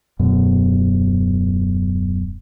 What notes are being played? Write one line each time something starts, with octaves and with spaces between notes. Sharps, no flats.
D#1 F#2 B2